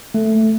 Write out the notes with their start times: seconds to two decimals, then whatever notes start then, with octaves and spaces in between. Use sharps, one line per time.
0.14 A3